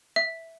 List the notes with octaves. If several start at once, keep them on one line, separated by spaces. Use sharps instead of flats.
E5